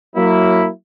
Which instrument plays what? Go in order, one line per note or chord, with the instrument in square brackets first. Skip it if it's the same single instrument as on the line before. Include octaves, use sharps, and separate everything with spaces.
[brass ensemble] F#3 A#3 E4